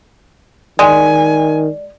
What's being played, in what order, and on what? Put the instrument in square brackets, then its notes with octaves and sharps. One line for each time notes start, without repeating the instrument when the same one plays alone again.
[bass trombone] D#3 [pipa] G#3 [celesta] D5 [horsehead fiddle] G#5